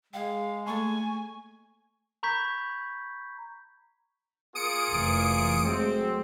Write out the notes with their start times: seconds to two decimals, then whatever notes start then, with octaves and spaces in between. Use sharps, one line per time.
0.13 G#3 G#4 F5 G5
0.66 A3 A#3 A4 G#5 C#6
2.23 A#5 B5 C#6 G6 G#6 B6
4.55 A#3 F4 G#4 D#6 C#7 D7
4.91 F1 E3
5.65 F#3 G#3 A3 C4